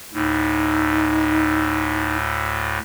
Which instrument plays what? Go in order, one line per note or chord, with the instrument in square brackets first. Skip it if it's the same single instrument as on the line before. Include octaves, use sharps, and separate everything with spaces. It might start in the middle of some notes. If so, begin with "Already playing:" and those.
[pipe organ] D2 A2 [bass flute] D#4